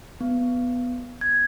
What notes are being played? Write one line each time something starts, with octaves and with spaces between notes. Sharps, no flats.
B3
G#6